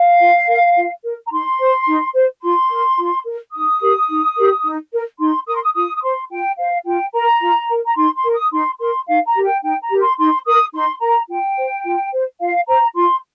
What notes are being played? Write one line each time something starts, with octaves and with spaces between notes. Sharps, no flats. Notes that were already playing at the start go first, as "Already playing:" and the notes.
Already playing: F5
F4
A#4
F4
A#4
A#5
D#4 C6
C5
D#4
C5
F4 C6
A#4
F4
A#4
D#4 D#6
G4 A#4
D#4
G4 A#4
D#4
A#4
D#4 C6
A#4 D#6
C6
D#6
F4 D#6
D#6
C5 C6
F4 G5
C5 F5
F4 G5
A#4 A#5
F4
A#4
A#5
D#4 C6
C6
A#4
D#6
D#4 C6
A#4 C6
D#4 F5
A#5
G4 A#4
G5
D#4 G5
A#5
G4 A#4
C6
D#4 C6
A#4 D#6
D#4 C6
A#4 A#5
F4 G5
C5
F4
C5
F4 F5
C5 A#5
F4 C6